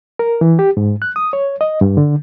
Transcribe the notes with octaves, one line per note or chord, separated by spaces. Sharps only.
A#4
E3
G4
G#2
F#6
D#6
C#5
D#5
G2
D3